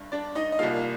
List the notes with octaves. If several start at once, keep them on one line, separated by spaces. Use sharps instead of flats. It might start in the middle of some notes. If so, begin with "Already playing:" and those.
Already playing: G1 G2
D4 D5
D#4 D#5
D#5
C2 A#2 G3 A#3 F4 F5